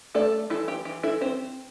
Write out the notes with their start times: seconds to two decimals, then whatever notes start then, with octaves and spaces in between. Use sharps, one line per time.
0.14 A3 A4 D5
0.50 E3 E4 A4
0.68 G4
0.85 E3 G4
1.03 E4 A4
1.21 C4 G4 C5